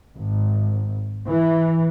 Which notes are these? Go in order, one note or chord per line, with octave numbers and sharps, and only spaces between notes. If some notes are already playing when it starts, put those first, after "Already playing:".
G#1
E3